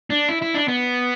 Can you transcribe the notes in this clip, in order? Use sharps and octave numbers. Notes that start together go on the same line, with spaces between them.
D4
E4
E4
D4
B3